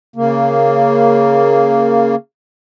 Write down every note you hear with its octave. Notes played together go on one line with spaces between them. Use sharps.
C#3 A#3